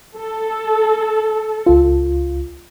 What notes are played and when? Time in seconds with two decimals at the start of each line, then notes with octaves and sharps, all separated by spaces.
0.17 A4
1.66 C#2 F4